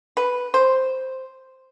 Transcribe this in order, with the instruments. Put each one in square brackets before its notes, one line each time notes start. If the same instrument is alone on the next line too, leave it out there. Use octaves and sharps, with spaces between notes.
[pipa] B4
C5